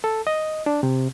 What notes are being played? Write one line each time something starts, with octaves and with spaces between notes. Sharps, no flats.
A4
D#5
D4
C3